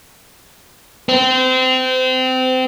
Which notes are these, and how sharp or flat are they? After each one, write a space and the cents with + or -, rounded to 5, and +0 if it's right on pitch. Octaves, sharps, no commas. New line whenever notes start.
C4 -25